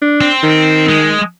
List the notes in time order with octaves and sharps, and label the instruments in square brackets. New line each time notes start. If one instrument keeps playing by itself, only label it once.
[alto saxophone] D4
[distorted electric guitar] C4
[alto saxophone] D#3
[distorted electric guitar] G#3